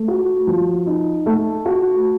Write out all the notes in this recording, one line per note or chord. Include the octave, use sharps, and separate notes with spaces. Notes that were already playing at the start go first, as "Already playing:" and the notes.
Already playing: A3
F#4
F3
D#4
A3
F#4